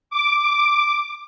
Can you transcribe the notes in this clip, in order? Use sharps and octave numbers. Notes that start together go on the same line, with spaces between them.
D6